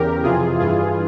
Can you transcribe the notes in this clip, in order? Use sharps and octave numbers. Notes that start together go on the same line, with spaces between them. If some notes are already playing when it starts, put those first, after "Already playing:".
Already playing: E2 C#3 G4 A#4
F2 C3 E3 F4 G#4
G2 E3 F4 G#4